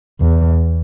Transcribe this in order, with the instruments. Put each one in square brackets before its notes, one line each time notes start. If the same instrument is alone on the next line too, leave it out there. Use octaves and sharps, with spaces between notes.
[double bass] E2